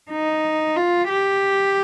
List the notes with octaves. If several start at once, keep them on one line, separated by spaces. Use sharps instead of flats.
D#4
F4
G4